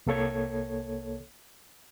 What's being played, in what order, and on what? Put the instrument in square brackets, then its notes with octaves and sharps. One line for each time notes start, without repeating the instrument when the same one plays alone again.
[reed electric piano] C2 A#3 A4 C#5 G#6